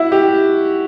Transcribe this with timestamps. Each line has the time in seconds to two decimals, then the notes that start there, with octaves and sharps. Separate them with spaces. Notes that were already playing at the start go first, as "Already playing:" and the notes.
Already playing: E4 F#4
0.12 G4